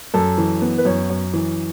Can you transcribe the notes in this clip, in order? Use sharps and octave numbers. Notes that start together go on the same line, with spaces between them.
F#2 A4
E3
B3
B4
F#2 C#5
F#2
E3